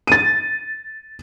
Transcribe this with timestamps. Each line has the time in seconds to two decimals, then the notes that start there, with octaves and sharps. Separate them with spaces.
0.07 A6 D#7